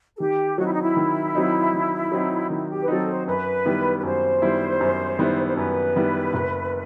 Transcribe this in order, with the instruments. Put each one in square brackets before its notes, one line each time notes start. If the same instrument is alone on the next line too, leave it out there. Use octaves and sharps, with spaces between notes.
[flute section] A4
[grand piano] D#3 [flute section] G4
[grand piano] F#3 C4 D#4 [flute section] F#4
[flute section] E4
D#4
E4
[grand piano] D#3
F#3 C4 D#4
D#3
F#3 C4 D#4
[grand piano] D#3 [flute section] E4
[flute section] G4
B4
[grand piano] F#3 C4 D#4 [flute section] A4
[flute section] C5
[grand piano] F#2 [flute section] B4
[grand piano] D#3 G3 B3 E4
[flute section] B4
[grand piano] F#2 [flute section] C5
[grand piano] D#3 G3 B3 E4
F#2
D#3 G3 B3 E4
[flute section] C5
[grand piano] F#2 [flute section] B4
[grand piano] D#3 G3 B3 E4
F#1